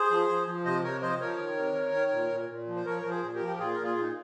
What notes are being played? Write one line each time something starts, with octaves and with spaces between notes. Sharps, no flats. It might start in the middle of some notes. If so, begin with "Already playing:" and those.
Already playing: G#4 C5
F3
F3
F3
C3 C5 D#5
C3 A#4 C#5
F3 C5 D#5
F3 A#4 C#5
D#3
C3
D#3
D#3
A#2
A#2
A#2
F3
C5
F3 A#4 C#5
F3 A#4
G#4 C5
A#2
G4 A#4
F3
G4
A#2 F4 G#4
A#2 A#4
F4 G#4
A#2
D#4